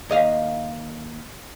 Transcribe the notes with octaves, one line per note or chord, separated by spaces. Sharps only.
D#2 D#5 F5